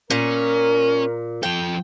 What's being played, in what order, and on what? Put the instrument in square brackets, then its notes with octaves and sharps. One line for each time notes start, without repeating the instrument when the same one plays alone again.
[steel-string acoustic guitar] A#2 [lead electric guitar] C#4 [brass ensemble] A#4
[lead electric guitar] F3 A4 [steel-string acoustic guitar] G5